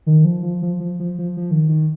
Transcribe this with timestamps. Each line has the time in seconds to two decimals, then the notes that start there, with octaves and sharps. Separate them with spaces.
0.07 D#3
0.25 F3
0.43 F3
0.62 F3
0.80 F3
1.00 F3
1.18 F3
1.37 F3
1.51 D#3
1.69 D#3